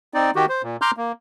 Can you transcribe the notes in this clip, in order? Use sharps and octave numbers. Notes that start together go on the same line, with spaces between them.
C4 D#4 D5
D#3 F#4 G4
C5
A#2
A#5 C6 D6 F6 G6
A#3